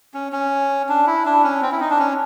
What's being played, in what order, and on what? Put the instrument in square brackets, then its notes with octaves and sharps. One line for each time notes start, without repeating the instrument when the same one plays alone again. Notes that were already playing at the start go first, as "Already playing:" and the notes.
[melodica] C#4
C#4
D4
E4
D4
C#4
C4
E4
D#4
D4
C#4